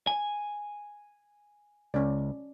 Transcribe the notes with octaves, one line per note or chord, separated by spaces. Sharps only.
G#5
C#2 C#4 D5